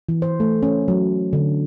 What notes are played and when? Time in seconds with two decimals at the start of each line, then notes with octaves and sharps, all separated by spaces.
0.09 E3
0.22 C5
0.40 A3
0.63 C#4
0.88 F#3
1.33 D3